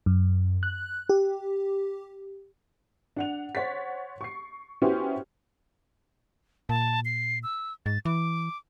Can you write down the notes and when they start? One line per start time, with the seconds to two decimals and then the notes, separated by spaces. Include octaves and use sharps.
0.06 F#2
0.63 F#6
1.09 G4
3.17 D4 F#5 F7
3.55 C5 C#5 F#5 A6 B6
4.21 C#6 C7
4.82 B3 C#4 E4 F#4 G4 C5
6.69 A#2 A5
7.05 C7
7.43 E6
7.86 G#2 A6
8.05 E3 D6